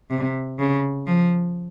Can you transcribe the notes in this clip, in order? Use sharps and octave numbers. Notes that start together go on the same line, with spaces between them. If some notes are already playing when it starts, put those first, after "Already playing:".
C3
C#3
F3